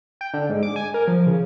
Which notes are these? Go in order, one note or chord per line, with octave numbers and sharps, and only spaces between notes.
G5
D3
G#2
D6
G#5
A#4
F3
C#3